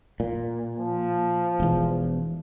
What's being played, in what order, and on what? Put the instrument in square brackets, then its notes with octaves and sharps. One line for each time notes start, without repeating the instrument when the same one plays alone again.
[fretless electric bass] A#2
[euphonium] F3
[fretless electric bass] E1 E2